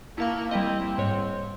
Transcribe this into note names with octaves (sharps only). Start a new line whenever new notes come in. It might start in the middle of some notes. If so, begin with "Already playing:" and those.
A#3 E4 A5 C#6
G3 C4 E4 D#5
G#2 C#5